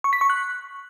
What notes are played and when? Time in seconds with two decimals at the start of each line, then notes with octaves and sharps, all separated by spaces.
0.04 C#6
0.13 B6
0.21 C#6
0.30 F#6